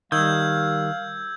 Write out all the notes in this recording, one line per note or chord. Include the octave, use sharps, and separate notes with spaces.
D#3 G3 F5 E6 G6 G#6